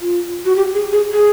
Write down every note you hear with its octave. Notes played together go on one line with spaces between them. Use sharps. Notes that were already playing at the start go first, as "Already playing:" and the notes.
F4
F#4
G4
G#4
G#4
G#4